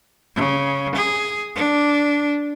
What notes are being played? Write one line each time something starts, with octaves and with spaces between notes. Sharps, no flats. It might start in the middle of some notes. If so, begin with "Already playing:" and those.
C#3
G#4
D4